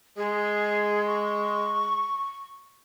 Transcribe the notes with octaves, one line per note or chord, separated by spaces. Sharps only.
G#3 G#4
C#6